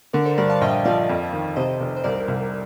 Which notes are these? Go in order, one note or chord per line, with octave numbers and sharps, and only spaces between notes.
D3 A#4 D5
A4 C5
G2 A#4 D5
F5 A5
A#1 D#5 G5
F3 D5 F5
F2
D#3
C3 C5 D#5
F1
C5
C2 A#4 D5
C2